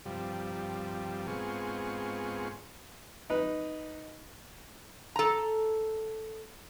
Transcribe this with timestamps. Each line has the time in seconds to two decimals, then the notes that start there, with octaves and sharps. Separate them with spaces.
0.05 G2 C3 F3 G3
1.27 G#2 B3 C4 F4 G#4 C#6
3.30 D#4 B4
5.16 A4 A#5